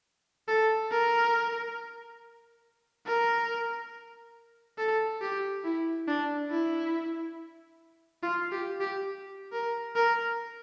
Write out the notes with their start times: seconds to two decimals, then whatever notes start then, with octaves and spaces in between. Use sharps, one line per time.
0.48 A4
0.91 A#4
3.06 A#4
4.78 A4
5.21 G4
5.64 E4
6.08 D4
6.51 E4
8.23 F4
8.52 G4
8.81 G4
9.52 A#4
9.95 A#4